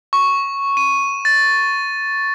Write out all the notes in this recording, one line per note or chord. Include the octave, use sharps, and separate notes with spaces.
C#6
D#7
A6